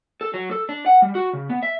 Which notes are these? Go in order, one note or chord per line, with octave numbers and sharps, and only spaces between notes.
A4
F#3
A4
D4
F#5
G3
F#4
C#3
B3
E5